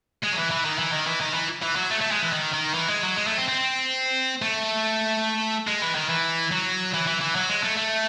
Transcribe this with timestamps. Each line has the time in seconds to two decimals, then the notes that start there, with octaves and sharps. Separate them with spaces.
0.23 G#3
0.33 F#3
0.37 E3
0.51 E3
0.65 D#3
0.79 E3
0.93 D#3
1.07 E3
1.21 D#3
1.34 E3
1.63 E3
1.76 F#3
1.91 A3
2.01 A3
2.11 G#3
2.22 E3
2.33 D#3
2.54 D#3
2.74 E3
2.88 G#3
3.03 F#3
3.16 G#3
3.27 A3
3.37 C4
3.48 C4
4.42 A3
5.68 G#3
5.82 E3
5.95 D#3
6.10 E3
6.51 F#3
6.94 E3
7.07 E3
7.21 E3
7.36 F#3
7.49 G#3
7.63 A3
7.77 A3